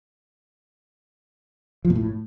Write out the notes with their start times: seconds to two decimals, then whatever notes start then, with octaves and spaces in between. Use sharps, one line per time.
1.85 F3
1.90 A#2
1.95 A2